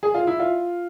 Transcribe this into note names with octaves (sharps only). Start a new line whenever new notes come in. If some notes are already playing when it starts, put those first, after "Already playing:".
G#4
F4
E4
F4